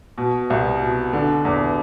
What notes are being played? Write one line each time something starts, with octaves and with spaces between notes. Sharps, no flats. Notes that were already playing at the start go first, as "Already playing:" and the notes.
B2
C2
B2
D3
E2